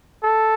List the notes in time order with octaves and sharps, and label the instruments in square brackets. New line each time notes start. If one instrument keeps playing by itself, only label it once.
[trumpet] A4